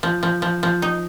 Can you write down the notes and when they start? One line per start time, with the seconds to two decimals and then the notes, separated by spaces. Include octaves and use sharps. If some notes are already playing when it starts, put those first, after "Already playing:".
0.03 F3
0.23 F3
0.42 F3
0.63 F3
0.82 D#4